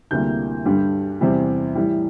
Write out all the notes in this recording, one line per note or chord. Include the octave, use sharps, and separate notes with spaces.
D2 C3 G3 A#3 E4 G6
G2 D3 G3 D4
E2 C3 G3 C4
A2 E3 G3